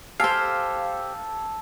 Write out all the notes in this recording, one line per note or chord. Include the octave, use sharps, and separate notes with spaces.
G4 A4 C5 F5 G#5